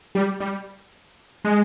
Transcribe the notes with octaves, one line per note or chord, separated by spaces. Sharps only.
G3
G3
G#3